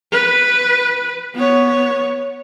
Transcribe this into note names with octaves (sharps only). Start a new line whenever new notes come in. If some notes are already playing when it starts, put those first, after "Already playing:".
B4
B3 C#5